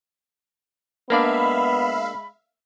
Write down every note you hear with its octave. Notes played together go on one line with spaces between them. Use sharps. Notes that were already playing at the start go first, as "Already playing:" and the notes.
G#3 A#3 B3 D4 D5 E5 F5 B5